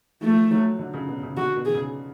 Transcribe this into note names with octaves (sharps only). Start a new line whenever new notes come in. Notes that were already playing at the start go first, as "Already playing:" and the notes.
F3 A3
F#3
D3
C#3
B2
C#3
D3 F#4
B2
G#4
C#3